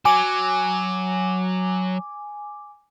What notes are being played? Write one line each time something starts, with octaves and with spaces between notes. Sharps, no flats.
F#3 G#5 D6